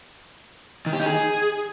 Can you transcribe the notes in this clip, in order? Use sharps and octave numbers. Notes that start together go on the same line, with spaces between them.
D#3
G4
D#4
G#4